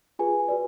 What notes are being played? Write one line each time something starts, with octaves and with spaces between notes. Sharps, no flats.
F4 G#4 B4 G#5
F#4 B4 D5